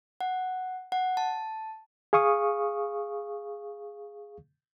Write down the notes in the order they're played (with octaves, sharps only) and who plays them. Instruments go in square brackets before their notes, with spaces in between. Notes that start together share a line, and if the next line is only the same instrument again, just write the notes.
[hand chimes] F#5
F#5
A5
[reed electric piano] G#4 F5 C#6 D#6